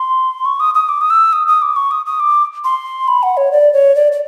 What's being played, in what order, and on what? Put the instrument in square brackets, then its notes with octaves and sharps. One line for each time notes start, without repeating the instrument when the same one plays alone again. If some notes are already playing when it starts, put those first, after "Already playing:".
Already playing: [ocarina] C6
C#6
D#6
D#6
D6
D#6
E6
D#6
D#6
D6
C#6
D#6
D#6
D6
C6
B5
F#5
C#5
D5
C#5
D5
D5